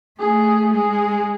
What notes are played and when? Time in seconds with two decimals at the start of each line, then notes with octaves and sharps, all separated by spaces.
0.20 A3 G#4
0.73 G#3 G#4